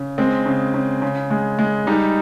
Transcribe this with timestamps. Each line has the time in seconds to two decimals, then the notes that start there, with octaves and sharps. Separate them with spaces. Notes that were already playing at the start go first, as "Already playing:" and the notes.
Already playing: C#3
0.18 G#3 C4
0.46 C#3
0.74 C#3
1.02 C#3
1.30 G#3
1.59 G#3
1.87 G3 D#4